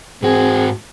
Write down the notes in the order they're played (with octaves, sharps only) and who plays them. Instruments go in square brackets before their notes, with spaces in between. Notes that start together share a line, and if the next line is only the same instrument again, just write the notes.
[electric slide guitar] G#2 F#4 [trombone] C4 [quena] G#4